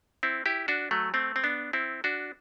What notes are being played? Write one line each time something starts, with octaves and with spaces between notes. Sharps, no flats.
C4 E4
E4 G4
D4 F#4
F#3 A3
A3 C4
C4
B3 D4
C4 E4
D4 F#4